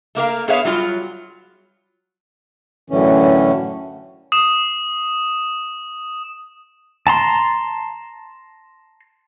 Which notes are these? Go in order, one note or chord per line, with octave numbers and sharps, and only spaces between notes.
A3 A#3 A#4 F5
B3 G#4 B4 C#5 E5 F5
F#3 G3 F4
F#2 A2 D3 E3 C#4
D#6 E7
A5 A#5 C6